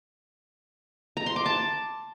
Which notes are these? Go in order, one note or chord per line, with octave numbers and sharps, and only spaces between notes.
A#5
C6
D6
A5